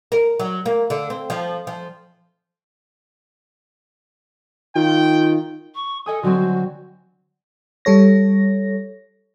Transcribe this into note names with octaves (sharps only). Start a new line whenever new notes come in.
A#4
F#3
A#3
D3
C4
F3
F3
D#3 F4 G5
C#6
A4 D#5 G#5 D#6
D3 F#3 C4 F#4
G3 A4 C#5 A#6